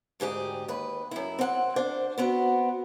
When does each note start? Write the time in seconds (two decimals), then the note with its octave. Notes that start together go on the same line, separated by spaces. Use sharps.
0.20 D2 G#2 G4 G#4
0.68 D#2 B4
1.11 F#2 E4
1.39 C4 F#5
1.76 D4 C5
2.18 B3 C4 F#4